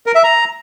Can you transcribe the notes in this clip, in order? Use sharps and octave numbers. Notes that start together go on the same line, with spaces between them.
A#4
E5
A#5